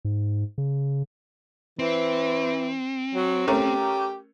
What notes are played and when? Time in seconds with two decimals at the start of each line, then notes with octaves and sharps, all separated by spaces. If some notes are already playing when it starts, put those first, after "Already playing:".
0.05 G#2
0.58 C#3
1.79 E3 C4
3.15 F#3
3.47 A3 C#4 G4 A#4